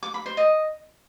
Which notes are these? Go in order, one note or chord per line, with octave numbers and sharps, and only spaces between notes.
D6
B5
C5
D#5